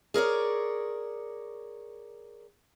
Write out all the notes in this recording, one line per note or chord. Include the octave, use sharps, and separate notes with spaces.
G#4 A#4 C#5 D5